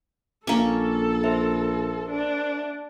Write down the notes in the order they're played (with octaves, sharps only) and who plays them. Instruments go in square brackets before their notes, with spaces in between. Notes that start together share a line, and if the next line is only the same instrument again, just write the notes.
[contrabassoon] A#1 [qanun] A#3 C#4 [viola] A4 [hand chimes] D6
[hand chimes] A#4 C5 E5
[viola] D4